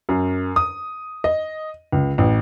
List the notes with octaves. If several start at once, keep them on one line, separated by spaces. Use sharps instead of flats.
F#2
D#6
D#5
C#2
A1